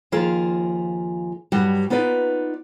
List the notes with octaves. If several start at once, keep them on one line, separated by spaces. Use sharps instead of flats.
D#2 F3 F4 G#4 A#4
G2 F#3 G3 F#4
B3 D#4 F4 B4 D5